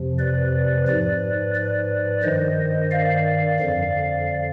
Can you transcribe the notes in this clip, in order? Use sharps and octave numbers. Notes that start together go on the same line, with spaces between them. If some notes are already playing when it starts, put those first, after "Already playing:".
Already playing: F2 C3 F3
B4 D5
G#2 F3 B4 D5
B4 D5
G2 D#3 C5 D#5
D5 F5
F2 D3 F3